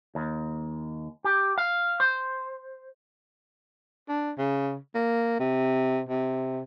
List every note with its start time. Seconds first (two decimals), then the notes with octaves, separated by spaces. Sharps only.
0.15 D#2
1.24 G4
1.58 F5
2.00 C5
4.09 D4
4.38 C#3
4.95 A#3
5.39 C3
6.09 C3